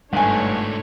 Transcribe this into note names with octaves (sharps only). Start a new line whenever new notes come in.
G1 G#2 D3 A3 D4 C#5 G#5